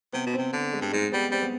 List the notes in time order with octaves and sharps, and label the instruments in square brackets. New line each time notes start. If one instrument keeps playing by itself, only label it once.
[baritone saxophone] C3 [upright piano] B3
[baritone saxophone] B2
[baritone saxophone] C3 [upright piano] C4
[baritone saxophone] D3
[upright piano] G#3
[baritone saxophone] G2
[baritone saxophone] G#2 [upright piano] G#3
[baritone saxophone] G3 [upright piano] B3
[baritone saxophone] G3 [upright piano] C4
[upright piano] B3